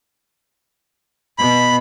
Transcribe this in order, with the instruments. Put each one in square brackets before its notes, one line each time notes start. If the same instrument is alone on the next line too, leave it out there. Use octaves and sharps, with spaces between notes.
[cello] B2 B3 [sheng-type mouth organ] B5